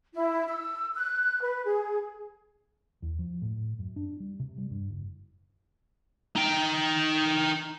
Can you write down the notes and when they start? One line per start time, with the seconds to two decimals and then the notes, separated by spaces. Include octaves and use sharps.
0.14 E4
0.48 E6
0.95 F#6
1.42 B4
1.65 G#4
3.02 E2
3.19 F3
3.42 A2
3.79 F#2
3.96 D4
4.20 G3
4.39 C3
4.58 G3
4.71 G2
4.90 F#1
6.36 D#4 G5